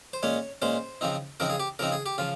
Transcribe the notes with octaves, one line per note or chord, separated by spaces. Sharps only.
C5
A#2 G#3 C#4 C#5
A#2 G#3 C#4 C5
C#3 F3 C4 D#4
C#3 F3 C4 D#4 A#4
G#4
G4
C#3 F3 C4 D#4 A#4
G#4
G4
C#3 F3 F4